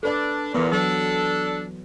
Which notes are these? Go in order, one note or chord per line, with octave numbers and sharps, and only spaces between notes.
D4 A4 B4 D5
E2 A#2 E3 B3
F#3 D4 A4